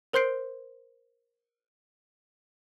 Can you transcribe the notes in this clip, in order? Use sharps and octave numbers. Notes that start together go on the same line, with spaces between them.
A#4 C5 C6 G6 C7 D7